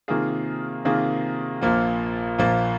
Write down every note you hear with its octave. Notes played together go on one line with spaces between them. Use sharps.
C3 D#3 A#3 F4 G#4
C3 D#3 A#3 F4 G#4
A#1 A#2 F3 A#3 F4
A#1 A#2 F3 A#3 F4